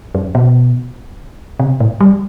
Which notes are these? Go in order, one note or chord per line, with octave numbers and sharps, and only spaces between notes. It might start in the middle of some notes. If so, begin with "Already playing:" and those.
F#2
B2
C3
A2
G3